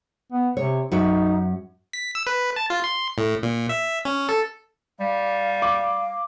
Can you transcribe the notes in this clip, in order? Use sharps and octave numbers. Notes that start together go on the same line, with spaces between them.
B3
C3 C#5
F#2 D#4 F#4 E5
B6
E6
B4
A5
F4
C6
A2
A#2
E5
C#4
A4
G3 F5
D6